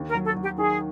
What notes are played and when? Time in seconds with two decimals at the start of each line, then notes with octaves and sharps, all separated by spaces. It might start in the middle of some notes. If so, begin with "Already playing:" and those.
Already playing: D#2
0.09 A#4
0.15 F#3
0.25 A4
0.37 F#3 G4
0.57 D#3 G#4